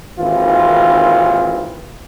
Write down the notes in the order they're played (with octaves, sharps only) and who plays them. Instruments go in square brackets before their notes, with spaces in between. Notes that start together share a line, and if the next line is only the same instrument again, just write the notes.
[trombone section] G#1 D#2 E3 C4 F4